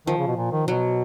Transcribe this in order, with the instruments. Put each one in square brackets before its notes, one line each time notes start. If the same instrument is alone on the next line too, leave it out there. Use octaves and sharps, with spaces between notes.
[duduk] D#3 [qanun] F3
[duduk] C#3
B2
A#2
D#3
[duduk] B2 [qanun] F#3